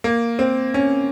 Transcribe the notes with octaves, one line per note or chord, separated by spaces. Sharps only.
A#3
C4
C#4